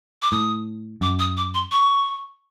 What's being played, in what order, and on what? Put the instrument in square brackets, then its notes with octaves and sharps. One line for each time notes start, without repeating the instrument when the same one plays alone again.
[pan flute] D6
[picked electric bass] A2 [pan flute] D#6
[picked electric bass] F#2 [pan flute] D6
[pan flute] D#6
D6
C6
C#6